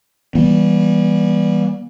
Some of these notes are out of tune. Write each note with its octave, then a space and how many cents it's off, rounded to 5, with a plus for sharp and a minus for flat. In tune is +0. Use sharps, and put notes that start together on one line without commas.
E3 -5 G3 +0 B3 -45